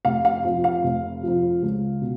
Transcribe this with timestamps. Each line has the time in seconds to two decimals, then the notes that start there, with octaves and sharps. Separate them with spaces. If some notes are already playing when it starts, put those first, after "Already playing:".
0.05 F1 F5
0.25 F5
0.44 F2 F3
0.64 F5
0.84 F1
1.23 F2 F3
1.62 C#2
2.02 B2